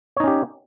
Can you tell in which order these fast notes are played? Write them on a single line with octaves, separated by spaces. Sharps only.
C#5 D#4 C#4 G4